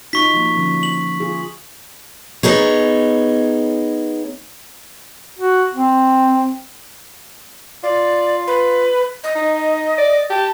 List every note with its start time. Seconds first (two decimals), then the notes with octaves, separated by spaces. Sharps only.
0.13 D#4 F4 F#4 C#6 B6
0.34 F3 A#3
0.56 D3 F3 C#4
0.83 F#7
1.20 F3 F4 G#4
2.43 B3 D#4 G#4 C#5
5.39 F#4
5.74 C4
7.83 F4 D5
8.47 B4
9.24 D#5
9.35 D#4
9.98 D5
10.30 G4 A5